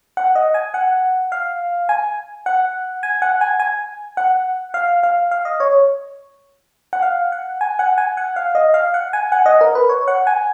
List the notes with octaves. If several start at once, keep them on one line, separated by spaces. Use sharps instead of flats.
F#5
D#5
G#5
F#5
F5
G#5
F#5
G#5
F#5
G#5
G#5
F#5
F5
F5
F5
D#5
C#5
F#5
F5
F#5
G#5
F#5
G#5
F#5
F5
D#5
F5
F#5
G#5
F#5
D#5
A#4
B4
C#5
F#5
G#5